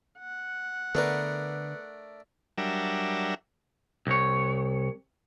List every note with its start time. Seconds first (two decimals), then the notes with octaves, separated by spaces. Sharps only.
0.19 F#5
0.95 D3 A3 B3 D4 A#4 B4
2.58 F#3 G3 D4 A#4 E5
4.07 C2 C#5